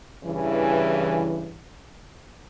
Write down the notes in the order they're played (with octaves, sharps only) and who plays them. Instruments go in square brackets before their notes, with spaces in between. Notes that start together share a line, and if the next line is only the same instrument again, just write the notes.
[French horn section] G2 C#3 E3